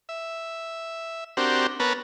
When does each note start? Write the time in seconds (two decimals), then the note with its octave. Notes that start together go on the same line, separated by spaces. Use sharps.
0.09 E5
1.37 C4 D4 F#4 G4 A#4 C5
1.80 B3 A#4 B4 C#5 A5